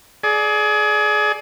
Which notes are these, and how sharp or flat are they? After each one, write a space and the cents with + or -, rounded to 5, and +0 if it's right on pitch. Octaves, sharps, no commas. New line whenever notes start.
G#4 +30 D5 +0